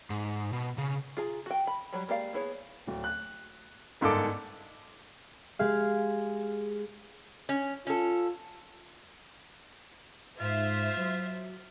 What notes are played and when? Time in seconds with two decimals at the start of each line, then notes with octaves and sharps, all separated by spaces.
0.10 G#2
0.53 B2
0.78 C#3
1.17 F4 G#4 A#5
1.46 F#4 G5
1.67 B5
1.93 F#3 G3 C#5 A#5 B5
2.08 G#3 A#3 G4 D5 F5
2.33 B3 E4 G#4 C#5
2.87 D1
3.04 F#6
4.01 G1 G#2 A#3 A4 D6
5.59 G#3 G4 G#4 F5
7.49 C#4
7.87 C#4 F4 A4
10.40 G#2 F4 C5 E5
10.97 F#3